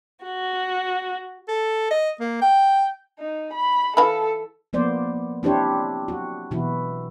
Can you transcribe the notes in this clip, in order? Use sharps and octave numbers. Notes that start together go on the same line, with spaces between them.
F#4
A4
D#5
A#3
G5
D#4
B5
E3 A4 F5 B5
F3 A#3 B3 C5 D5
C4 D4 E4 G4 C5 C#5
F#4
B2 E3 E4 F#4